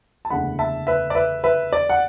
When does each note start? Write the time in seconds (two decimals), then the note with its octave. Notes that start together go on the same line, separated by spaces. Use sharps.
0.25 A5
0.30 F#1 E2 D3 A3 F#5 B5
0.59 E5 A5
0.87 B4 E5
1.10 D5
1.15 B4 E5
1.44 B4 E5
1.73 D5
1.89 F#5